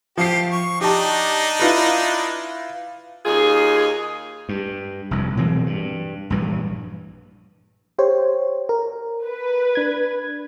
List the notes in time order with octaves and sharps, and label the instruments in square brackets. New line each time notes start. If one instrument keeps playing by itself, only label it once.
[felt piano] F3 C7 [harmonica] G4
[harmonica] C#6
[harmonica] D4 D#4 [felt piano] G4 A5
[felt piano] E4 F4 B4
[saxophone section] D#2 D#4 F4 G#4
[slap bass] G2
F1 C2 F2
B2 E3 F#3 C4
G2
A#1 G2 E3
[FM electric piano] G4 C5 C#5
A#4
[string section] B4
[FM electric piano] D4 G#6